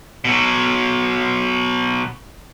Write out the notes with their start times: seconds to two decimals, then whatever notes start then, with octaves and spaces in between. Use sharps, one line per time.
0.25 B2 F#3